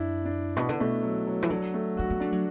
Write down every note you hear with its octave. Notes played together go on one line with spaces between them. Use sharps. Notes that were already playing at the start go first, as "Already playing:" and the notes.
Already playing: F#2 D4 E4
D4
B2 B3
D3
B2 A3
F#3
F#3
E3
D3 F#3
A3
D4 F#4
B3
A3 D4
F#3